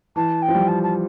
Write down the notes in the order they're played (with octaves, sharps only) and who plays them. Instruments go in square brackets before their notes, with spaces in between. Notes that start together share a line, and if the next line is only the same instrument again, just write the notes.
[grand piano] E3 [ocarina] A5
[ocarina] G5
[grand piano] F3
G3
[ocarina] A5
A5